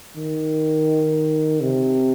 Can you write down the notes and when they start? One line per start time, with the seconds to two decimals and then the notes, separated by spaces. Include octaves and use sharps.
0.16 D#3
1.61 C3